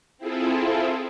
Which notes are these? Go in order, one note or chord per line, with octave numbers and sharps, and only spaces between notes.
C4 E4 F4 G#4 A4